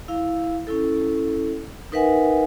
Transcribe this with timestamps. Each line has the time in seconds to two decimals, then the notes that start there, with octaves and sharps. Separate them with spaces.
0.08 E4 F5
0.67 C#4 E4 A4
1.92 D#4 A#4 B4 E5 F#5 G#5